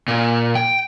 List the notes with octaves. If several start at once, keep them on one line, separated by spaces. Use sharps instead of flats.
A#2
G5